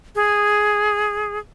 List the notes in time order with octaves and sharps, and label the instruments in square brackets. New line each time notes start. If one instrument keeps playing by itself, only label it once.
[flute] G#4